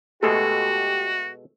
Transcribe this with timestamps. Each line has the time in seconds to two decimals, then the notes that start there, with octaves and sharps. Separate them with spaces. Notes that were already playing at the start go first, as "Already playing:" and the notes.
0.23 B2 G#3 A3 F#4 G4 A4